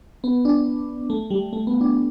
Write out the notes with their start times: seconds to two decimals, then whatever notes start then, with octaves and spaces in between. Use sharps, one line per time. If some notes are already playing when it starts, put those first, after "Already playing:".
0.24 B3
0.45 D4
1.10 A3
1.30 G3
1.53 A3
1.67 B3
1.81 D4